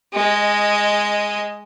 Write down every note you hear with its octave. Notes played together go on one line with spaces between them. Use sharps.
G#3 D#5